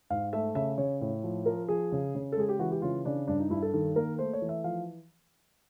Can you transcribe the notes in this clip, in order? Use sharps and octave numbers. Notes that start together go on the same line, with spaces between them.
G#2 F5
A3 E5
C#3 E5
C#3 C#5
A2
F3
F3 A#4
F3 G#4
C#3
C#3
A4
G#3 G#4
G4
E3 F#4
G4
C#3 F4
C#3 D4
G2 D4
D#4
G2 E4
A4
D#3 A4
A#3 A#4
A3 C5
C#5
E3
E5
F3 F5